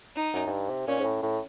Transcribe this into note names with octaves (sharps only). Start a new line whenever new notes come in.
D#4
F#2
F#2
G2
C3
A#2 C#4
G#2
A2
A2